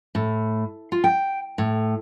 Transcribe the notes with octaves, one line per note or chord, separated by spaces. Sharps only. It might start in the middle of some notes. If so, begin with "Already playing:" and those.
A2
F4
G5
A2